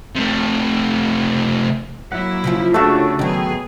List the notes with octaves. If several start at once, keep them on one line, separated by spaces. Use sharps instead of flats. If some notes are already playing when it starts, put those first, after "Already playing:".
C3 A3
F#3 A#3 E4 F#5
C#3 F3 F4
C#3 A3 D4 F4 F#4 A4 E5
D#3 F#3 B3 G#4